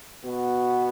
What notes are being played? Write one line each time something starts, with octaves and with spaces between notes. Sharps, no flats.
B2 B3 F#4